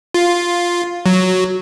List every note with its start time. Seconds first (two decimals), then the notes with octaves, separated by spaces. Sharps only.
0.14 F4
1.06 F#3